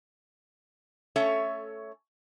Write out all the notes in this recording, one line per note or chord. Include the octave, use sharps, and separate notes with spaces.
A3 C#4 A4 C#5 E5